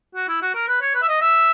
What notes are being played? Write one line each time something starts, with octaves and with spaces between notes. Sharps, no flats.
F#4
E4
F#4
A#4
B4
C#5
B4
E5
D#5
E5